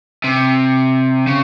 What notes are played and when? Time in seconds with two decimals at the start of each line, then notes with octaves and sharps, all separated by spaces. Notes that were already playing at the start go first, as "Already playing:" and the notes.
0.24 C3
1.27 C#3